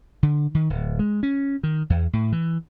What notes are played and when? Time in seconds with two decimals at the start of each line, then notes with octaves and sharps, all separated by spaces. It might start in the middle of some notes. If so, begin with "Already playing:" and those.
0.23 D3
0.55 D#3
0.70 D1
0.99 G#3
1.23 C#4
1.63 D#3
1.90 E2
2.13 A2
2.32 E3